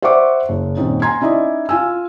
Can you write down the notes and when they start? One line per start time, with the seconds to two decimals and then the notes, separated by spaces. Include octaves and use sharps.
0.02 C5 D5 E5 F#5 C#6 D6
0.49 F#1
0.77 D#1 F#2 C4 D#4
1.02 G#5 A#5 C6 G#6
1.21 C#4 D#4 E4 D5 D#5
1.69 F4 G#5 E6